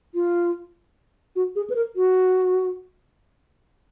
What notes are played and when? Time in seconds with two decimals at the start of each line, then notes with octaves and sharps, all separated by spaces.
0.15 F4
1.36 F#4
1.56 G#4
1.70 B4
1.75 A#4
1.96 F#4